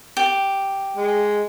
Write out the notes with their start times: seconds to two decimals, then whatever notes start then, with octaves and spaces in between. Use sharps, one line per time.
0.17 G4
0.97 G#3